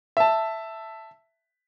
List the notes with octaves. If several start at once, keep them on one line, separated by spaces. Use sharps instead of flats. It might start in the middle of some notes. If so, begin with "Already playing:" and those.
E5 A5